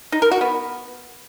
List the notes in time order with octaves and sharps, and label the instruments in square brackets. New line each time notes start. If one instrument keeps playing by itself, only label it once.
[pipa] D#4
A#4
F#4
B3